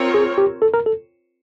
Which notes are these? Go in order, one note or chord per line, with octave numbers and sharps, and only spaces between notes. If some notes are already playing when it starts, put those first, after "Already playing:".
Already playing: C4 F4 A#4 C#5
G#4
G4
A4
A#4
A4